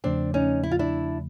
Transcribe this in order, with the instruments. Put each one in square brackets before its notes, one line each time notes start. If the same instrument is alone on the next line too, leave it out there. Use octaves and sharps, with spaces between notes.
[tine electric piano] E2 C#3 F3 A3 [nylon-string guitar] C4 D4
[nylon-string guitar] C#4 D#4
E4
F4
D4 E4